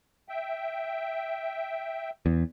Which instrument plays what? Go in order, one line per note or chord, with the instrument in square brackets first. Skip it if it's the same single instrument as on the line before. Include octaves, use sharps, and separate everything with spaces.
[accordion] E5 G5
[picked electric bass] E2